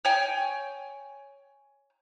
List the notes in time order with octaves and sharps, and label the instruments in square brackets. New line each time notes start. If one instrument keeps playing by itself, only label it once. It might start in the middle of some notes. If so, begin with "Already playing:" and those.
[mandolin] C#5 G5 G#5